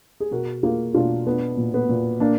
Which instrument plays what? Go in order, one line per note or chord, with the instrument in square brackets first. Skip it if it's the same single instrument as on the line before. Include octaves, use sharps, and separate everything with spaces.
[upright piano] G#4
B2 F#4 A#4
A#3 F4 G#4
B2 D4 F4
B3 D4
A#2
B3
A#2
A#3 D4